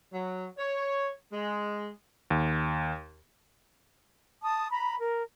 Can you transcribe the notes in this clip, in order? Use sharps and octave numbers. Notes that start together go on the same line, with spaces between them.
F#3
C#5
G#3
D#2
A5 D#6
A#5 B5
A#4